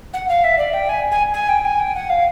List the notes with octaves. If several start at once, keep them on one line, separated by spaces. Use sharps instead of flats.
F#5
F5
E5
D5
G5
G#5
G#5
G#5
G5
G#5
G5
F#5
F5